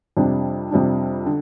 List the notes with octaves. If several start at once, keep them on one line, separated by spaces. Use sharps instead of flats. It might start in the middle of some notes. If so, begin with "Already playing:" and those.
F2 C3 G3 D4
F2 C3 G3 D4
D3